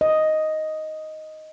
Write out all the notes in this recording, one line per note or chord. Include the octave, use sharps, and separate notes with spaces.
D#5